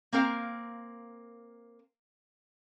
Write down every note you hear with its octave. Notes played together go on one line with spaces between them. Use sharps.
A#3 C4 A#4 F5